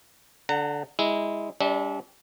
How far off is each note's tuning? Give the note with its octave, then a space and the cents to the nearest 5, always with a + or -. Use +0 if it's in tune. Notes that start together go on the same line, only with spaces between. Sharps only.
D3 -10 F#5 +20 A#5 -35
G#3 -15 E4 -20
G3 +20 D4 -35 E5 -35